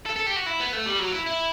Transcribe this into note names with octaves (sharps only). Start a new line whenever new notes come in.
A4
A4
G4
F#4
E4
B3
A3
G3
F#3
E4
E4